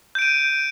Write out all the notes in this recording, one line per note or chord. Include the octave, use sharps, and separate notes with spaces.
G6 D7 D#7